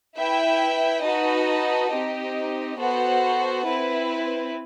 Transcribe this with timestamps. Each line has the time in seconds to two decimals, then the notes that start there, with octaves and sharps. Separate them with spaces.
0.16 E4 B4 E5 G5
1.03 D#4 F#4 B4 D#5 A5
1.90 C4 D#4 G4 D#5
2.77 B3 F#4 A4 C5 F#5
3.65 C4 E4 B4